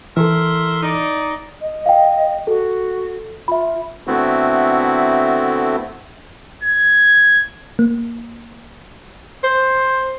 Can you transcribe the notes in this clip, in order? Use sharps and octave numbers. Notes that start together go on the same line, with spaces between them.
E3 E4 A4 A#4 E5 C6
D#4 D5
D#5
F5 G5
F#4 A4
F4 E5 B5
D3 A3 B3 C4 E4 F#4
G#6
A#3
C5